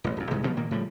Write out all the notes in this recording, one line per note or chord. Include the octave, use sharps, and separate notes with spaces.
E1 A1
D1 F2
C2 G#2 G#3
D2 B2 F3
A#2 D#3 A#3
A2 C#3 F3 G3